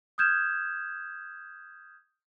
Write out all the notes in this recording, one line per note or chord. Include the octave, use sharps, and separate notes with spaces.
D#6 F6 G6 G#6 E7